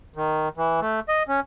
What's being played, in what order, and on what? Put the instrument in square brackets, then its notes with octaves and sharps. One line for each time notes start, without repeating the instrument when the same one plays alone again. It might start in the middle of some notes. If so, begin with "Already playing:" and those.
[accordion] D#3
E3
A3
D#5
C#4